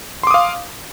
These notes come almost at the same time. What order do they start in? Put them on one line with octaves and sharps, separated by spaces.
C6 D6 D#6 F5